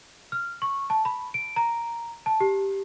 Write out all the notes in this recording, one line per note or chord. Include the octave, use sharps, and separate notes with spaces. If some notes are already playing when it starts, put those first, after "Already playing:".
F6
C#6
A5
B5
D7
A#5
A5
G4